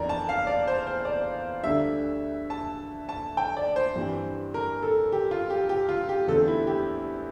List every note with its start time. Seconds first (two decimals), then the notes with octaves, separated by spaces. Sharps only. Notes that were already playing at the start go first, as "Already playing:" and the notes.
Already playing: F1 E2 E3 D4 A#4 D5 A#5
0.09 A5
0.29 F5
0.47 D5
0.67 C5
0.87 C5
1.05 D5
1.63 D2 D3 G3 D4 E5
2.50 A5
3.09 A5
3.37 G5
3.57 D5
3.76 C5
3.96 G2 E3 G3 C4
4.54 A#4
4.83 A4
5.12 G4
5.31 F4
5.50 G4
5.69 G4
5.89 F4
6.09 G4
6.27 E2 D3 A3 C4 A4
6.48 E4
6.67 G4